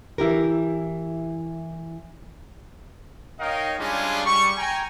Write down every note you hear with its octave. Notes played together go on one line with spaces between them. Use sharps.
E3 E4 G4 A#4
D#4 A#4 C#5 D#5 F5 G5
G3 G#3 C#4 D4 F4 G#4
G3 C#6
G5 G#5 A#5